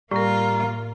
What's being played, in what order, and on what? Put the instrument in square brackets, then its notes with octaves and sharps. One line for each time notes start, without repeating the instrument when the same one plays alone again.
[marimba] A2 A#4 [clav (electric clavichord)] G3 [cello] A#3 F4 [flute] A#5